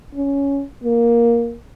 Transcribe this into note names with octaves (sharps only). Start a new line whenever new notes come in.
C#4
A#3